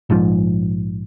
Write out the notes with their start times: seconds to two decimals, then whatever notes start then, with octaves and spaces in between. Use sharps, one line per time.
0.10 A#1 G#2 F3